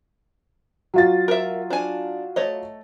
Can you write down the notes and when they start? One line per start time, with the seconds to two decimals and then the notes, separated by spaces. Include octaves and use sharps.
0.94 F#3 F4 A6
1.28 A#4 E5
1.70 D4 G#5
2.36 A3 C#5 D#5